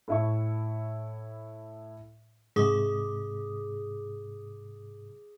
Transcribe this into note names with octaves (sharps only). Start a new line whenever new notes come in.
A2 E4 C#6
G#2 C3 G#4 D6 D#6